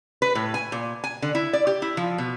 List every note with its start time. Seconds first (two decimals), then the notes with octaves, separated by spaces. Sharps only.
0.22 B4
0.35 A2
0.54 G#5
0.72 A#2
1.04 G#5
1.22 D3
1.35 E4
1.53 D5
1.67 G4
1.82 E4
1.97 F3
2.18 B2